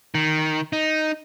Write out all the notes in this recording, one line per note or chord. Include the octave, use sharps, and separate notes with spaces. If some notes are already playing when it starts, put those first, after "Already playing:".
D#3
D#4